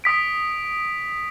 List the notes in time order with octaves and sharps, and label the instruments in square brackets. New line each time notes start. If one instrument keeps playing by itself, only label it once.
[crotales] D#6 B6 D7